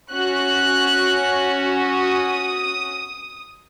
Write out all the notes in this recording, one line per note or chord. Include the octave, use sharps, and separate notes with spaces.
C#4 F#4 F#6
D#6